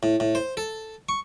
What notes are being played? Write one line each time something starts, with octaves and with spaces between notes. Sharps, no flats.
A2
A2
C5
A4
C#6